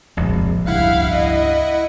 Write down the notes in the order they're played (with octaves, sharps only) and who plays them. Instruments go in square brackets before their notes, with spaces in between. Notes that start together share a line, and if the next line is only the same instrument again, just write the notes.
[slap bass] D1 A#1 [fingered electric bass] F2 C3 G#3
[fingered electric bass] C#2 G2 [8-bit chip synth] E4 F#5 [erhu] F5
[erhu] D#5